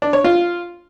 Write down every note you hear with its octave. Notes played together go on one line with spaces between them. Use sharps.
D4
C#5
F4